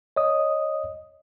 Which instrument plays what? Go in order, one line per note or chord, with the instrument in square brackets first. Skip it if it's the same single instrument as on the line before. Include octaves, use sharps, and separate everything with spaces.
[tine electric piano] C#5 D#5 D#6